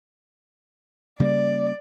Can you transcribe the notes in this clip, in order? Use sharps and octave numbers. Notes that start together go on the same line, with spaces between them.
C#3 G3 A#3 D5